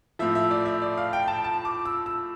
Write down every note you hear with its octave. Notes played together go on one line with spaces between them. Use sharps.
A2 F3 E5
E5
D5
E5
D5
F5
G5
A5
A5
D6
E6
E6